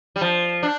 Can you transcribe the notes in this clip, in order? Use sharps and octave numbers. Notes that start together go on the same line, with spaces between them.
G3
F3
D4